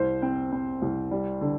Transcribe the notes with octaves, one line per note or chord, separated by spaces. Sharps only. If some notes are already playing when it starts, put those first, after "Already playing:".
Already playing: C2 C5
C4
C4
C2
G3
D3